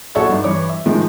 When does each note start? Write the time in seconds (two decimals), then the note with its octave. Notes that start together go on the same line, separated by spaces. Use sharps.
0.15 A#1 F#4 A4 C#5 E5 C#6
0.30 G2 D#4
0.44 G2 E3 E4 C#5 D6
0.69 E5
0.86 A2 D#3 F3 G#3 D#4